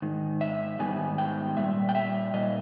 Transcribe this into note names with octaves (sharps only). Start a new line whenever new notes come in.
G#2 D#3
E5
G#2 D#3 G3 B3 G#5
G5
A#2 G3 E5
G5
E5
A#2 G3 D#5